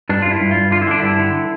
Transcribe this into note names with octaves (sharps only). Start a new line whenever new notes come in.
G2 D4
G2 F4
E4
G2
F4
G2
D3 F4
E4
D3 D4
G2 E4
D3